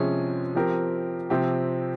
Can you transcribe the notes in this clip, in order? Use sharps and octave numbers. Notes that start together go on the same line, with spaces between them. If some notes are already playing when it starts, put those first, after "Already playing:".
Already playing: C3 F3 G#3 C#4 G#4
F3 C4 G4 A#4
C3 F3 C4 G4